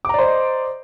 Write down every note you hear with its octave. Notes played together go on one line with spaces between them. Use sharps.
C5 D5 D#5 A#5 D6